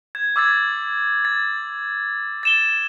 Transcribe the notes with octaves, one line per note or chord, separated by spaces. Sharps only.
G#6
D6 E6 G#6 A6
A6
A6 E7 G7